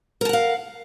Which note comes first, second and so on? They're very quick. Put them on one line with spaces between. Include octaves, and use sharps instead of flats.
A#4 A5 F#5 F5